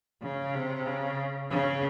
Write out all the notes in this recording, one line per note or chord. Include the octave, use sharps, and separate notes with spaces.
C#3
C3
C#3
C#3